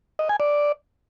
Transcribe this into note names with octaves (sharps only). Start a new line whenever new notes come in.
D#5
G#5
D5